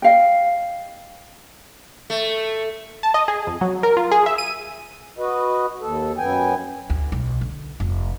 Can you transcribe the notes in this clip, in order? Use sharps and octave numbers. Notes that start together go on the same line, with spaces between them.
D#5 F5 G5
A3
A5
D#5
G#4
F2
F#3
A#4
F4
G#4
E5
D#7
F#4 B4 D#5
D#2 A4
F#2 B3 G5 G#5
D2
B1
D3
F1